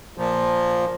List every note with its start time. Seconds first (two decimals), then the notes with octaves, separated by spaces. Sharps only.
0.17 A#2 F3